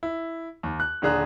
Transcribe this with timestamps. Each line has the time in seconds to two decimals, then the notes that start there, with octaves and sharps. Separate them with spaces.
0.03 E4
0.63 D#2
0.80 F#6
1.02 D#1 D3 D4 G#4 A#5 F#6